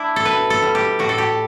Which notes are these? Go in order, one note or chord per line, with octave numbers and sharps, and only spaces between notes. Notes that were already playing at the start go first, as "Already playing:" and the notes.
Already playing: D4 E4
A4
B2 B4
A4
G3
G4
A2 F#4
A4
G4